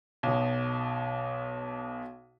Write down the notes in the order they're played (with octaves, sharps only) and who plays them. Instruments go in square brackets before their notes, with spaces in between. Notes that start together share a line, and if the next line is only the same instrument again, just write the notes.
[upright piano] B1 B2